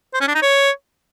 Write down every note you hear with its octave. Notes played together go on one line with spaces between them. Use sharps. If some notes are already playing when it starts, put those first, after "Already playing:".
C5
C#4
D4
D#4
C#5